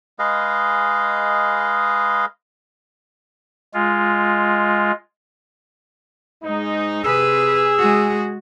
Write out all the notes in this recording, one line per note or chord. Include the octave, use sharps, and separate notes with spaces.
G#3 G#4 B4 D#5 F5
G#3 F4
G#2 G#3 D#4
C3 G#4 B4 E6
G#3 F#4